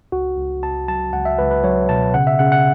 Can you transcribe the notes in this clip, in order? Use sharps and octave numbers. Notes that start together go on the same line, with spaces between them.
C#2 F#4
C#2
C#2 A5
F#3 A5
C#2 F#5
E5
C#2 B4
B4
F#3 C#5
B2 A5
C#3 F#5
E5
C#3 F#5
F#5